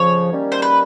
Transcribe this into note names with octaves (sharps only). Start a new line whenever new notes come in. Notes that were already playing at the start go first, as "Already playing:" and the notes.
Already playing: F2 C#3 F3 C#5
D#3 G3 A#3 C#4
C5
B4